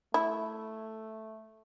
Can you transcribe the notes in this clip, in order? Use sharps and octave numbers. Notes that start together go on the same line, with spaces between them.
A3 E4